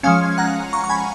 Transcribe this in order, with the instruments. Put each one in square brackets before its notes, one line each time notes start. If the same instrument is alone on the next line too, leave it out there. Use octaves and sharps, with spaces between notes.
[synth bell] F3 G#3 C#4 F5 G#5
F#5 A#5
A#5 C#6
C#6
G#5 B5